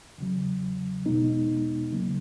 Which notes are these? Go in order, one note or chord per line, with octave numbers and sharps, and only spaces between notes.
E2 C#3 F#3
E2 B2 G#3 B3 D#4
C#3 F#3 A#3